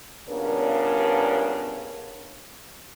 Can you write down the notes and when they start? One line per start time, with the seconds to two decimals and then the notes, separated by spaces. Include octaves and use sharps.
0.30 G2 A#2 C#3 B3 D4 A#4